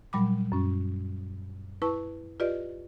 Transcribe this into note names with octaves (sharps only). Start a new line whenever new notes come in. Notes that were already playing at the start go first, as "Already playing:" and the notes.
A#2 F#3 G3 B5 D6
F#2 C#4
E4 B4 A5 C#6
F4 G4 B4 D5 D#5